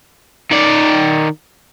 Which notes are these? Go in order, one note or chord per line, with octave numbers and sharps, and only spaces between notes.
D#3 D5